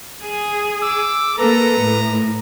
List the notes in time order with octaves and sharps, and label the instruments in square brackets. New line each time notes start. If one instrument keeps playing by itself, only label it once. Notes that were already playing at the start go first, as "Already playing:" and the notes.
[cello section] G#4
[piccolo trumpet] D6 [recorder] E6
[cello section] A#3 A4 [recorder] B4 [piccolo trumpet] A#5
[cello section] A2